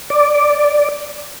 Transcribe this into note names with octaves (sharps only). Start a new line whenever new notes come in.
D5